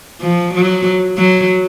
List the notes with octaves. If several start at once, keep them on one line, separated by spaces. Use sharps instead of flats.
F3
F#3
F#3